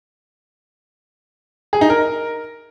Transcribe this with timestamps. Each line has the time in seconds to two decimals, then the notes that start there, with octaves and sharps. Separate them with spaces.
1.73 G#4
1.81 D#4
1.90 A#4